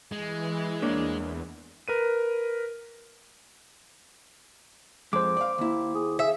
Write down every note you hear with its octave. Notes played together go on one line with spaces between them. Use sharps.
E3 G#3
E2 A#3 D4 C#5
A#4 B4 D#7
F2 G#3 C5 D6
D5 F5
D#2 A#3 E4
G#4
G#4 E5